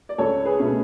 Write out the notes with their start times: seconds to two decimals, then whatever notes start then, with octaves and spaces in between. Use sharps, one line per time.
0.09 D5
0.18 C#2 A4 C#5
0.45 G#4 B4
0.60 B2 A3 C#4